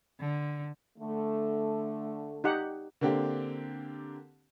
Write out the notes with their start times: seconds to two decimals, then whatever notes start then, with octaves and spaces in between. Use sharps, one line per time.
0.19 D3
0.98 D3 A3
2.44 D#4 G4 F#5
3.01 D3 A#3 C4 D4 G4